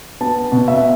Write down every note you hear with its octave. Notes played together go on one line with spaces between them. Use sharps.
B3 A5
B2
E5